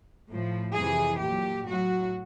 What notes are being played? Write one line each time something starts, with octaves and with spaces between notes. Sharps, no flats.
A2 F3
F2 C3 E3 G#4
A#2 F#3 G4
A2 F#3 F#4